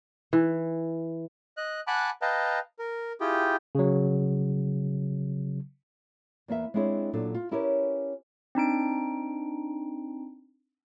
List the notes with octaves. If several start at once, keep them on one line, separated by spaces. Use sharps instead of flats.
E3
D#5 F#6
F#5 G#5 A5 B5 D6 F#6
B4 D#5 F5 G5 A5 A#5
A#4
E4 F4 G4 G#4 G5
C#3 F#3
E2 A#3 B4 E5
G#3 C4 D4 E4 G#4 C#5
A#2 F#3 D4 A4
F4
C#4 E4 G4 A#4 B4 C#5
C4 D4 D#4 D7